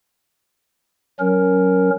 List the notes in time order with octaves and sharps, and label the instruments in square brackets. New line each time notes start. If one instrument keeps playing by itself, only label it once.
[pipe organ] F#3 C#4 A#4